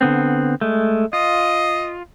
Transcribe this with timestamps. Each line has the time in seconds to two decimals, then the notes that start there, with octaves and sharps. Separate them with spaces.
0.01 D3 B3 C4
0.61 G#3 A3
1.13 F4 D#5